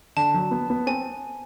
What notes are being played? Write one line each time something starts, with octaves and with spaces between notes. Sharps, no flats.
D3 A5
F#3
B3
B3
C4 G#5